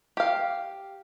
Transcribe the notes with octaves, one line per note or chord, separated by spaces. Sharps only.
G4 F5